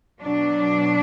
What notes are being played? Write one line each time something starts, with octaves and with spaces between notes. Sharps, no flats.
B2 F#3 D4